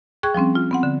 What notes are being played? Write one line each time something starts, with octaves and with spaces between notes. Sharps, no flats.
G#4 G5 C#6 F#6 G#6
F3 G3 C4 C#4
F4
B3 C4 F#5
D3